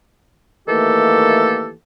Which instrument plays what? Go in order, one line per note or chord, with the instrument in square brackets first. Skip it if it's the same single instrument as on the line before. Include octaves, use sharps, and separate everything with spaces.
[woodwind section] D#3 E3 A3 A#3 G4 A4